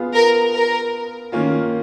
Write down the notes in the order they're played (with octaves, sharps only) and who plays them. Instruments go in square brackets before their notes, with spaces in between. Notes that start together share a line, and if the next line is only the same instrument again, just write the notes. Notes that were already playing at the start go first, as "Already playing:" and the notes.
Already playing: [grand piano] B3 F4 G#4
[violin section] A#4
A#4
[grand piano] D#3 A#3 C#4 F4